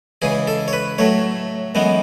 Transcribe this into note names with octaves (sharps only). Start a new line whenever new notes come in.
C#2 C#3 E3 G#4
A4
C#5
B4
A2 F#3 A3 C#5
F#2 E3 G#3 B3